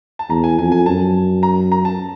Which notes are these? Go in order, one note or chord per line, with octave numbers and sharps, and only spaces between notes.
A5
E2 A#5
G#5
F2 G#5
G#5
F#2 A5
A#5
A#5
A5